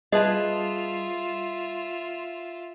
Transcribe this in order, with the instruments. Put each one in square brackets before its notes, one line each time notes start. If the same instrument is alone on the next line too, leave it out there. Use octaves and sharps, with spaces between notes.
[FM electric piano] G3 C6 [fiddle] F4 E5 [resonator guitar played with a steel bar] G#4 B4 A5 [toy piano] D#5